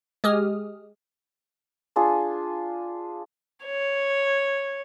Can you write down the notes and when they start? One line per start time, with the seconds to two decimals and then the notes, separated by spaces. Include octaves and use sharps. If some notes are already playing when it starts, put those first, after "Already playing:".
0.24 G#3 G4 G#4 D#6 F6
1.96 D4 F4 G#4
3.64 C#5